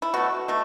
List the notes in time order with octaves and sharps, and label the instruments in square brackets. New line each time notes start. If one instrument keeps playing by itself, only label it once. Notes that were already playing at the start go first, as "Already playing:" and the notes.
[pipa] E4
B2 A3 F#4
B2 A3